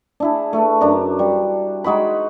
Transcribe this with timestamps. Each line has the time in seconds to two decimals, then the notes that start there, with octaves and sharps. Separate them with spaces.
0.20 D4 E4 G#4
0.53 A3 A4 B4
0.81 F#2 D4 A#5
1.19 G3
1.84 G#3 D#4 F#4 B5